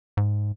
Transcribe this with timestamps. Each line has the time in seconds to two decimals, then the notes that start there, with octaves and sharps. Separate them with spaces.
0.17 G#2